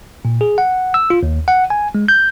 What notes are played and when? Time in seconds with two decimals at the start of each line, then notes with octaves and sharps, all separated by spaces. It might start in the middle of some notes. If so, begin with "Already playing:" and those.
0.25 A#2
0.41 G#4
0.58 F#5
0.94 E6
1.10 F4
1.23 D#2
1.48 F#5
1.70 G#5
1.95 G#3
2.08 G6